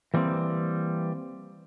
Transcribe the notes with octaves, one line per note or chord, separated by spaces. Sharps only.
E3 G3 A#3 C4